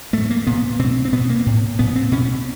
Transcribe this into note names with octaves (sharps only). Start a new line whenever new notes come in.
A2 A3
A#3
A#2 B3
B2 C4
C4
B2 B3
A#3
A2
A#2 B3
C4
B2 C#4